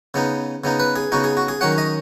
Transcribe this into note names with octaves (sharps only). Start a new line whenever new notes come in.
C#3 B3 D#4
C#3 B3 D#4
B4
G#4
C#3 B3 D#4 F#4
G#4
F#4
G#4
D#3 F#3 C#4 F#5
D#5